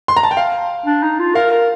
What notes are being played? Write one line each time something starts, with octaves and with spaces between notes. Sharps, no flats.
C6
A#5
A5
G5
F5
D4
D#4
F4
A#4 F5
A#4